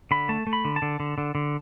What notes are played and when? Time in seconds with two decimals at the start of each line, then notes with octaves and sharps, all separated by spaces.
0.11 D3 B5
0.29 A3 A5
0.47 A3
0.53 B5
0.65 D3
0.76 A5
0.82 D3
1.00 D3
1.18 D3
1.35 D3